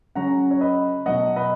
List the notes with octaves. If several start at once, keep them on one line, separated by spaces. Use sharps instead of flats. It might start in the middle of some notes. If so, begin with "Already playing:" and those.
C#3 F#3 C#4 F#5 A#5
C#5
B4 D#5
B2 F#3 A#3 D#5 F#5
B4 D#5